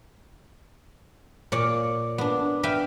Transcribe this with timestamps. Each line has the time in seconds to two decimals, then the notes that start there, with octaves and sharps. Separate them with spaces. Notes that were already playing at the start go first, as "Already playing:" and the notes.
1.52 A#2 C#5 D5
2.18 B3 D4
2.63 B4 E5 F5 G5